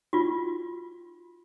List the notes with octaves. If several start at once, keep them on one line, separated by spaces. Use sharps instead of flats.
F4 F#4